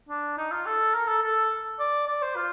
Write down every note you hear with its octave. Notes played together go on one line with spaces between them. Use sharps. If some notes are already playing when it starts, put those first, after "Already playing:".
D4
D#4
F4
A4
A#4
A4
A4
D5
D5
C5
F4